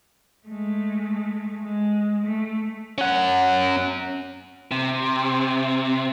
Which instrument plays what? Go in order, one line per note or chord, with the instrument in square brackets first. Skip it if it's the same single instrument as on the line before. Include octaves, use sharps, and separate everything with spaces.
[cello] G#3 A3
G#3
A3
[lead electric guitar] C#4 F#5
C3